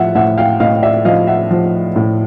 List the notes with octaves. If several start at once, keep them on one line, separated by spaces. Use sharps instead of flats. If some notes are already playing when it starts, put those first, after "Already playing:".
Already playing: A2 F3 E5 F#5
A2 E5 F#5
F5 G5
A2 D#5 F5
D5 E5
F3 D#5 F5
E5 F#5
F3
A2